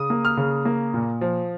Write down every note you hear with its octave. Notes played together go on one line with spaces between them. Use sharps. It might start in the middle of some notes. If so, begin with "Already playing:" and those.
Already playing: C#3 D#6
A#3
F6
C#3
A#3
A#2
F3